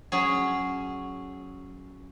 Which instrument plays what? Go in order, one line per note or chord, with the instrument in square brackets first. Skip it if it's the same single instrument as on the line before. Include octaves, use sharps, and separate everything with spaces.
[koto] F#3 C#4 G#4